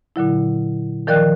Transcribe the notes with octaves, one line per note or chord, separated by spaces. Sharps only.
A#2 D3 F#3 E4
D#3 F3 A#4 D5 G5 F#6